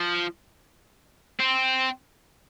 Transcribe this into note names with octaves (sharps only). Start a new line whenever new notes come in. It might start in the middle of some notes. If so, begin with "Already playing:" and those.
Already playing: F3
C4